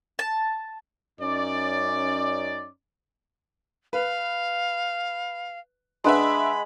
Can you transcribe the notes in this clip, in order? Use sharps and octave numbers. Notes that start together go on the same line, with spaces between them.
A5
F#2 C#4 D#4 D5
B4 F5
G#3 D4 B4 D#5 E5 F#5 B5